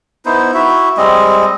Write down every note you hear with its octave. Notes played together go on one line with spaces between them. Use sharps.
B3 D#4 E4 C5
E4 F#4 E5
G3 G#3 C4 D#5